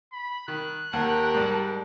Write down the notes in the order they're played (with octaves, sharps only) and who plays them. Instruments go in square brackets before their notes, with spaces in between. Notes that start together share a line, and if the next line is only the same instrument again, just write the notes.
[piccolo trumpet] B5
[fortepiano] D#3 [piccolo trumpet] F#6
[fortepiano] D#2 F#5 [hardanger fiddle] G4 A#4 [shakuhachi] A5
[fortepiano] G#2 G3